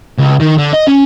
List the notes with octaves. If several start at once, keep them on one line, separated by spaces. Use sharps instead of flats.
C#2
D#3
D3
D#5
C#4